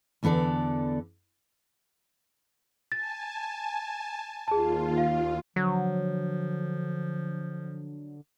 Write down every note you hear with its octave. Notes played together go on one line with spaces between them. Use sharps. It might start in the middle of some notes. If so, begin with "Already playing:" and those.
E2 D3 B3 A4 D5
G#5 A5 A6
D#2 F4 G#4 A5
F5
D3 F3 F#3